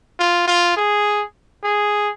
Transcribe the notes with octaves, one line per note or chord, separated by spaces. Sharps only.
F4
F4
G#4
G#4